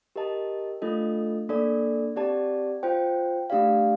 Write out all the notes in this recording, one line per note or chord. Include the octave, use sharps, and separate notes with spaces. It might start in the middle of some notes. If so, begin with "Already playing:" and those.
G4 A#4 D#5 A5
A3 D4 F4 A4 D#5
A#3 D4 A4 D5
C4 G4 D5 A5
F4 C5 G5
A3 D4 G4 D5 F5